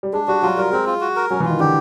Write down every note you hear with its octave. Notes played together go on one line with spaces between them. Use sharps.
G3
G#3 D4
G3 F#4
F#3 F4
G3 A#4
G#3 C4
F4
F#4
A#4
F#3 C#4
E3
D#3 F4
D3 G4